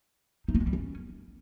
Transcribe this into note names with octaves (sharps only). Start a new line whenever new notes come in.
D#4
A#3
G#3
G3
C#4